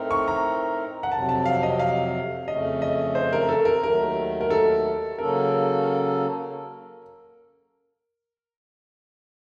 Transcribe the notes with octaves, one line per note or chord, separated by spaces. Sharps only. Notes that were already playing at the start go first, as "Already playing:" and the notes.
Already playing: A2 A3 C4 D#4 A#4
C#6
A#5
F#5
F2 C3 F#3 A5
A5
F5
D#5
F5
F2 C#3 A3 C#4 D#5
D#5
C5
A#4
A4
A#4
D#2 D#3 F#3 A3 A#4
A#4
A4
C#3 F#3 A#3 C#4 A4 A#4